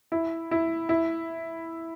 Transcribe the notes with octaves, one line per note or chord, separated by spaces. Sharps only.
E4
E4
E4